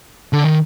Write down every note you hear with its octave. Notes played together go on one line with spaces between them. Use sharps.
D3
D#3